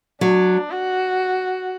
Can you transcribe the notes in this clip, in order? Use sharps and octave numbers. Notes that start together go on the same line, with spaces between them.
F#3 D4
F#4